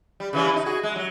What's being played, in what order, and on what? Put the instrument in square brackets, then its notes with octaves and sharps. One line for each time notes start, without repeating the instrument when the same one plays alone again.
[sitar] G3
C#3 E3 G3
D4 D#4
F#4 G#4
G#3
F#3